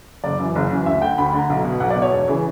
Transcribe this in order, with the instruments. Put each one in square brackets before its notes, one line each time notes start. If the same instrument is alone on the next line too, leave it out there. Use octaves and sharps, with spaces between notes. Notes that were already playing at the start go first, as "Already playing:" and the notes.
[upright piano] F#1 D5
F#2 E3
F#1
F#2 E3
D2 E5
D3 G5
D2 B5
B5
D3
A#5
B1
B2
B1 F#5
D5
B2
C#5
E1
C#3 E3